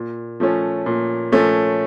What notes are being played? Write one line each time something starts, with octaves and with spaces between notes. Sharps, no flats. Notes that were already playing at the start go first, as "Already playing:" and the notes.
Already playing: A#2
F3 A3 C#4
A#2
F3 A3 C#4